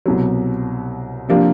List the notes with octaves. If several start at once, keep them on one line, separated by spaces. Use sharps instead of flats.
C2 B2 F#3
C3 F3 A#3 D4